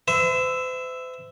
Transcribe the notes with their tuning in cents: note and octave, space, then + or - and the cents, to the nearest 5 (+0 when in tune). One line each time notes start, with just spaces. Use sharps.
C5 -45 E5 +0